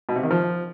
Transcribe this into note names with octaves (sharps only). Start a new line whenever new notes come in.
B2
C3
D#3
F3